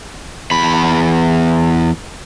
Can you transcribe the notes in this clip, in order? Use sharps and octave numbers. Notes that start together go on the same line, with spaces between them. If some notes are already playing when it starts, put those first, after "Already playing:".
E2 B5